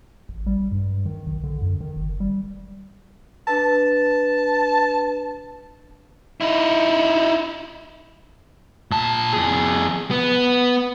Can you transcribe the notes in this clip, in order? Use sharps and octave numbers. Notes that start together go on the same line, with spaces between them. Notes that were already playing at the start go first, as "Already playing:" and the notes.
A1
G3
G2
D#3
B1
D3
F#2
D#3
F#1
G3
D4 B4 A5
D#4 E4
A#2 A5
F2 G#4
B3